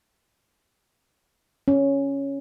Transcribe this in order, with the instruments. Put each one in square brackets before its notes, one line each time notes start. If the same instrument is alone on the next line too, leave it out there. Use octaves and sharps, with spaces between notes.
[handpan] C#4